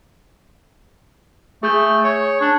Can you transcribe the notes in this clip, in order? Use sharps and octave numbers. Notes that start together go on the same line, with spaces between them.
A3 G#4 G6
C#5
D4